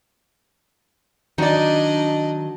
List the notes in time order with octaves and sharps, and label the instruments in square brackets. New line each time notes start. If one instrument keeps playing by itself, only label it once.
[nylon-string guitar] D#3 F#3 [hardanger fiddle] D4 D#5 [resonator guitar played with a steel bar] D#4 D5